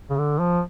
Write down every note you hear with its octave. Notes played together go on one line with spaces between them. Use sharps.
C#3
D3
F3